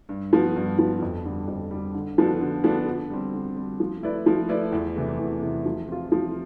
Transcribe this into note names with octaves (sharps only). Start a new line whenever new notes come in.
G2
F3 B3
G2
F3 B3
F2
D3 G3
F2
D3 G3
D3
F3 B3 D4 A4
D3
F3 B3 D4 A4
D3
G3 C4
D3
G3 C4
F3
A3 E4 B4 D5
F3
A3 E4 B4 D5
E2
C3 E3 A3
E2
C3 E3 A3
F3
C4 F4
F3